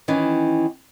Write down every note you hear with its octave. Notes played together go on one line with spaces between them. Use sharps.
D#3 E3 C#4